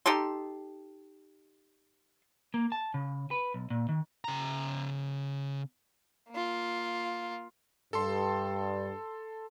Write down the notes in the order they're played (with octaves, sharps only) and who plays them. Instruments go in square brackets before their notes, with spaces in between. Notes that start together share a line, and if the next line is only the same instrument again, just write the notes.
[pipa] D#4 G4 A4 C6
[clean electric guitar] A#3
A5
C#3
B4
B1
A#2
D#3
[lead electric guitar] C#3 A#5
[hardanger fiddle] A#3 F4
[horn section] G2 [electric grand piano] A4 A5 C6